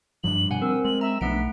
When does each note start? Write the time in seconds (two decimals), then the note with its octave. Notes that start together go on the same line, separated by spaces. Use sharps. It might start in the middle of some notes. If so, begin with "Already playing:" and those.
0.24 G2 F3 G3 D4 F#7
0.51 B2 F#5 G#5
0.62 C4 A#4 E6
0.85 G#3 F#7
1.01 E5 A#5
1.21 B1 F3 A3 B3 D4 F#5 B6 D7